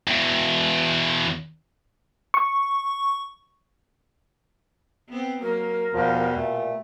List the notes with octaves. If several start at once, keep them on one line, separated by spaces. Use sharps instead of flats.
E2 B2
C#6
B3 C4
F#3 A#3 A#4
E2 B2 F3 G3
A#2 A3